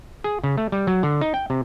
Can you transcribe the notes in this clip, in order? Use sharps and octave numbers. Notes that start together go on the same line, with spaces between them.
G#4
C#3
A3
G3
F#3
D3
D#4
G5
C3